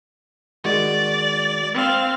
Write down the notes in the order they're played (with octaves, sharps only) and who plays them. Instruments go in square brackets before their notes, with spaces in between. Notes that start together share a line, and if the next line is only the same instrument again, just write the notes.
[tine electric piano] D#3 G#3 F#4 [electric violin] D5
[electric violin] C4 F5